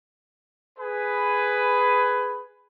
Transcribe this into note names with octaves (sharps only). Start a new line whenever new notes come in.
G#4 B4